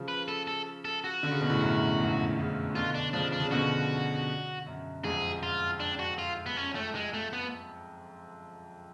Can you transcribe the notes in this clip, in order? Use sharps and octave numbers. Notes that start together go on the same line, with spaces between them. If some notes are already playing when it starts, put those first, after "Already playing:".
Already playing: C#3 F3
B4
A4
A4
A4
F#4
D3
C#3
B2
A2 C#3
F#2
F2 G#2
A2 C#3
B2 D3 F4
D4
C#3 F3 D4
D4
C#3
B2 D3 F#4
F#2
F2 G#2 G#4
F4
D4
F#4
F4
B3
C#4
A3
G#3
A3
B3